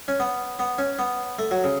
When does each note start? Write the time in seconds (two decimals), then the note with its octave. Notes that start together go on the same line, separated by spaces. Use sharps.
0.08 C#4
0.20 B3
0.59 B3
0.78 C#4
0.99 B3
1.39 A3
1.51 F#3
1.64 C#3